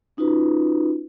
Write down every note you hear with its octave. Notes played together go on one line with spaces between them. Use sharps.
C#4 D#4 F4 F#4 B4